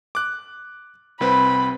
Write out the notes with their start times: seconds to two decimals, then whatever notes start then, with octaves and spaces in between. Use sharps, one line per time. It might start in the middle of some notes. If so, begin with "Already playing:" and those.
0.15 D6 F#6
1.21 C2 C4 B4 B5